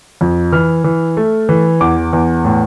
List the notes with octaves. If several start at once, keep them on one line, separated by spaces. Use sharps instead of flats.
F2
E3 F6
E3
A3
E3
E2 D6
E2
A2